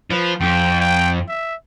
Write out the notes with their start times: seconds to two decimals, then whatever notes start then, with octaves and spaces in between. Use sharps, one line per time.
0.11 F3 B4
0.41 F2 G5
0.80 G5
1.28 E5